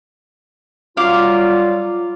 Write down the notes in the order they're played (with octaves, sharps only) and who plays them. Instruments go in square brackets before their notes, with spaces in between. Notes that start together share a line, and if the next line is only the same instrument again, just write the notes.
[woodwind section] F#3 G3 F4 [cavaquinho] F5 D6